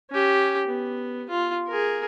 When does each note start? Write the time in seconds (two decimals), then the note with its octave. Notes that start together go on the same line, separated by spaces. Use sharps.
0.10 C#4 G4
0.67 B3
1.29 F4
1.68 G#4 A#4